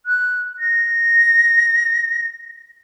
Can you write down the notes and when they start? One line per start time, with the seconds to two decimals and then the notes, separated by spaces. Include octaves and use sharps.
0.06 F#6
0.59 A#6